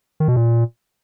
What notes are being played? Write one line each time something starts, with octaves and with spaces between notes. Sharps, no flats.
D#3
B2
A#2